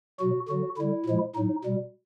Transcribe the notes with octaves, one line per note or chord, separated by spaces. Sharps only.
B2 F#3 F#4
D3 F#3 F#4
D3 G3 E4
A#2 F3 G#3
A2 F#3 D#4
B2 G3